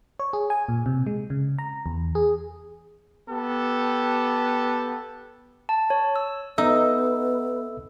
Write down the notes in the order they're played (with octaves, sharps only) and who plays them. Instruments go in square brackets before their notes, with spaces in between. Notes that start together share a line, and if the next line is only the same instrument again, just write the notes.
[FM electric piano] C#5
G#4
G#5
A#2
C3
G#3
C#3
A#5
E2
G#4
[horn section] B3 G4 A4
[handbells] A5
C#5
E6
[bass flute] B3 [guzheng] D#4 [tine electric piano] A4 E5 E6